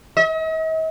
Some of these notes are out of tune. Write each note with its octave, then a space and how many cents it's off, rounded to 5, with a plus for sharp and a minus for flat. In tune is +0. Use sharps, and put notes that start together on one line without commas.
D#5 +45